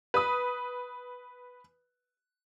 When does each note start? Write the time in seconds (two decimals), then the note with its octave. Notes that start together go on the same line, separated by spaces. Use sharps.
0.14 B4 D#6